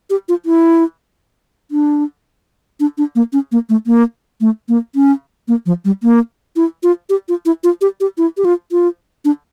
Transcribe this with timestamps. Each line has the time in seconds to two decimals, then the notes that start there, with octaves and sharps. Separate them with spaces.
0.10 G4
0.29 F4
0.46 E4
1.71 D4
2.80 D4
2.98 D4
3.15 A#3
3.33 C#4
3.52 A#3
3.69 A3
3.87 A#3
4.41 A3
4.68 A#3
4.95 C#4
5.48 A#3
5.66 F3
5.85 G3
6.03 A#3
6.56 E4
6.83 F4
7.09 G4
7.28 F4
7.46 E4
7.64 F4
7.81 G4
8.00 G4
8.18 E4
8.37 G4
8.45 F4
8.72 F4
9.25 D4